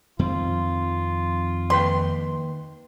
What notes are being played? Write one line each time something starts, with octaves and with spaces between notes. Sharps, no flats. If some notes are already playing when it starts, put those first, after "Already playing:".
F2 D#3 C4 F4
D#2 B4 G5 C6